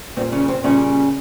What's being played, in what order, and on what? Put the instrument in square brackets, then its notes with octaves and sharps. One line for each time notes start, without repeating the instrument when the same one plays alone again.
[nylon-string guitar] A#2 G3 A#3 C4
C#3 C#4
C4
A#2 C#3 G3 A#3 C#4